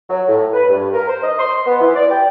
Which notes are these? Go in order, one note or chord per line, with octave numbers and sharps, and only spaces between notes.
F#3
A2
B4
G2
A#4
C5
D#5
C6
B3
E3
D5
G5